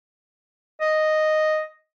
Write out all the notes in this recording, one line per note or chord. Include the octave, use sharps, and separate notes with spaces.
D#5